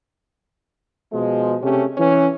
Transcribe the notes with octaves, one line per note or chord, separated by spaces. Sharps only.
B2 F3 G#3
C3 A3 C#4 G4
E3 C#4